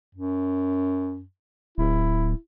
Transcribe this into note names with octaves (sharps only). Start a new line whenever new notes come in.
F#2
D1 E4